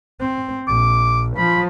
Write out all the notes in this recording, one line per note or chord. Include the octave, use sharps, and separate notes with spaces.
C4
A#1 D6
F3 B5